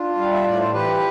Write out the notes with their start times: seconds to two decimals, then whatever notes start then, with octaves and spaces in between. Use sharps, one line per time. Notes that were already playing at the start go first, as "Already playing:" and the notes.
Already playing: D4 F4
0.16 G3 F5
0.32 E5
0.43 A2 D5
0.58 C5
0.72 E3 G4 B4